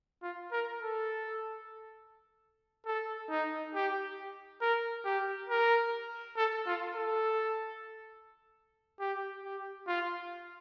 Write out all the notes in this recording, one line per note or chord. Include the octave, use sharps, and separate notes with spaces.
F4
A#4
A4
A4
D#4
G4
A#4
G4
A#4
A4
F4
A4
G4
G4
F4